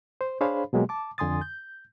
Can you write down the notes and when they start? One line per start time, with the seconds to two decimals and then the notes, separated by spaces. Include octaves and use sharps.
0.21 C5
0.41 D4 G#4 C5 C#5 F5 B5
0.73 B2 F#3 G#3 A#3 G4
0.89 A5 D6
1.18 F2 D3 G#5 C6 D#6 A6
1.41 G6